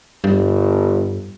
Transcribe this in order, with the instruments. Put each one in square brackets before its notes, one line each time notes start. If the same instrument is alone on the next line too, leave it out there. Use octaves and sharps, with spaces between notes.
[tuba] G1 [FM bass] G2